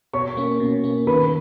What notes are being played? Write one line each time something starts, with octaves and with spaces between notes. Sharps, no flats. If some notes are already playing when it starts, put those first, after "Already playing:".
B2 C#5 C#6
A#3 C#4
B2
A#3 C#4
D#3 B4 B5